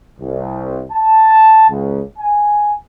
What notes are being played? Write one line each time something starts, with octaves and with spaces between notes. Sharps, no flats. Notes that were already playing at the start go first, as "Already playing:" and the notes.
C2
A5
C#2
G#5